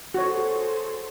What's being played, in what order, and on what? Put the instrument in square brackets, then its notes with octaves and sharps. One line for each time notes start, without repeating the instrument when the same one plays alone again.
[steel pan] F#4 C#5 [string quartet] G#4 A4 C5